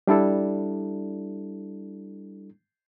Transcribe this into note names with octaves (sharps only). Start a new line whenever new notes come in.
G3 D4 E4 A4